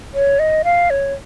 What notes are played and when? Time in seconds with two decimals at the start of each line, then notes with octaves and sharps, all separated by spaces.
0.14 C#5
0.39 D#5
0.64 F5
0.90 C#5